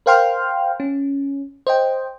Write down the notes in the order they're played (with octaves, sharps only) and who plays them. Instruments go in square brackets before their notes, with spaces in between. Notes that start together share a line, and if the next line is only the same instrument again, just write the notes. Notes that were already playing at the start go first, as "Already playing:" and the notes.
[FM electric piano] A#4 C5 F5 G5 C6 F6
C#4
C5 D#5 G5